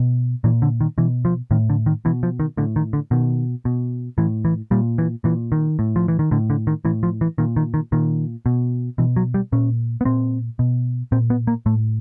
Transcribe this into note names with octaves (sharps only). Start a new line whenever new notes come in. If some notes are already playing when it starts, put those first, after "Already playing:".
Already playing: B2
A#2 E3
D3
D#3
B2 E3
F3
A2 D#3
D3
D#3
B2 E3
F3
D#3
A2 D3
D#3
D3
B2 D#3
B2
A2 E3
E3
A#2 G3
E3
A#2 E3
D#3
A2
F3
E3
D#3
A2 D3
D3
D#3
A2 E3
F3
E3
A#2 D#3
D#3
D#3
A#2 D#3
B2
B2 E3
F#3
G3
A#2 C#4
B3
A#2 C4
B2
A#2 C4
B3
A#3
A2 A3